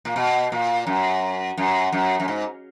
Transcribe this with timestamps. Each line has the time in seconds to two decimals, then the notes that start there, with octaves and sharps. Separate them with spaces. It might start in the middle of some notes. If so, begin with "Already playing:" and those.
0.05 A#2
0.16 B2
0.52 A#2
0.87 F#2
1.58 F#2
1.92 F#2
2.20 F#2
2.28 G#2